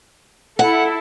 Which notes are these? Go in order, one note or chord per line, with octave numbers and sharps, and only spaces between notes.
E4 A4 F#5